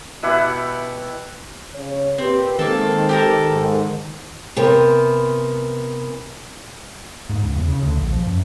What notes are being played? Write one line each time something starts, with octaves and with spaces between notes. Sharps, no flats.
B2 E4 G4 F#5
C#3 C#5
A#2 C4 G4 B4
D#3 G#3 A#3 C4 A4
G4 A4 A#4
G#2
C3 E3 B3 A#4 C5
G#2
C#2
E2
C#3
D2
A#1
F3
F#2